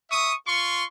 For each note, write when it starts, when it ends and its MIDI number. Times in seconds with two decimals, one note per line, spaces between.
0.10 0.33 76
0.10 0.33 85
0.10 0.33 87
0.47 0.83 65
0.47 0.83 84
0.47 0.83 85